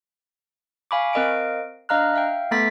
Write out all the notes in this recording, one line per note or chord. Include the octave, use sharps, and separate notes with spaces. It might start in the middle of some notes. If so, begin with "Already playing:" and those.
F5 G#5 B5 C#6 D6
C4 A#4 D#5 F5 D7
D4 D#5 F5 A#5 F6 F#6
E5 F5 G5
A3 B3 A4 B5 A6 B6